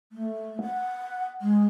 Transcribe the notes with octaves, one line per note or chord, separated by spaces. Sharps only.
A3
F#5
G#3